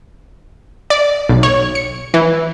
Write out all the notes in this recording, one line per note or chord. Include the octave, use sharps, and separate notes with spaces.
D5
B1
C#5
C#7
E3